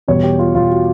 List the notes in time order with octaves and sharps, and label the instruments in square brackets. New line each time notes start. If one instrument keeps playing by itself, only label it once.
[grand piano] E2 B2 G3 C#5
G4
F4
E2 B2 G3 F4
F#4